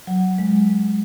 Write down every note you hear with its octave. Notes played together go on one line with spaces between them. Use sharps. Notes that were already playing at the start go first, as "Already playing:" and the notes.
F#3
G#3
F#3